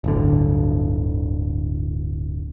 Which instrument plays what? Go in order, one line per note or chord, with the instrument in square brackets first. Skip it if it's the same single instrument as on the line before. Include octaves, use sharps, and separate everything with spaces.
[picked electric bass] D1 G1 D3